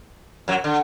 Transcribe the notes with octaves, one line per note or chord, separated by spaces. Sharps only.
F#2 F#3
D3